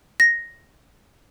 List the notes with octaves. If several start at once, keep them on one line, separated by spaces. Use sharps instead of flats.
A#6